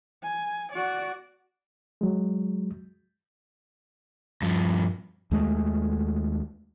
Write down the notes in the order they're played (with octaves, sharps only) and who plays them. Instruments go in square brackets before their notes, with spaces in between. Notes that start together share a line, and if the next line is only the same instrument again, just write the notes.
[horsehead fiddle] G#5
F#4 D5
[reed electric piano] F#3 G#3
[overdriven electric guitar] G2 F3
[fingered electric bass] D#2 G#3 A3